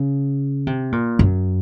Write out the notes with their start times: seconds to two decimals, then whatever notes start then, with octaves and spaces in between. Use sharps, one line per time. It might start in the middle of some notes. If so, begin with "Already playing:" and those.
Already playing: C#3
0.67 C3
0.92 A#2
1.19 F#2